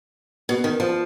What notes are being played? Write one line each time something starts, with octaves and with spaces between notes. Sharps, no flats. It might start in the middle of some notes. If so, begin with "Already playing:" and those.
B2
D#3
F3